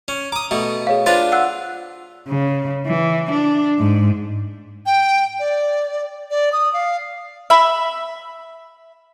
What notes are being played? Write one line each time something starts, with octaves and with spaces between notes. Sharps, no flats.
C#4
A#5 D6 D#6
B2 A3
G#4 C#5 F5
D4 F4 B4 C5 C6 A6
F#5 E6 F#6
C#3
E3
D4
G#2
G5
D5
D5
D#6
F5
E5 B5